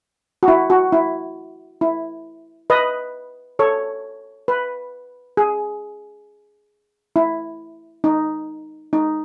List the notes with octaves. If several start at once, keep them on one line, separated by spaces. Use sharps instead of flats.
F#4
E4
F#4
E4
E4
B4 D#5
A4 C#5
B4
G#4
E4
D#4
D#4